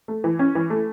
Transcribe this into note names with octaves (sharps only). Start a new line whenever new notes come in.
A3
E3
C#4
E3
A3